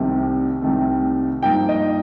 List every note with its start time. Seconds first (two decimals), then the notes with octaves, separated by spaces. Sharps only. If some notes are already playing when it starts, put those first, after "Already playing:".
Already playing: C2 C3 D#3 A3
0.62 C2 C3 D#3 A3
1.43 G2 F3 A#3 D#4 G5
1.69 D#5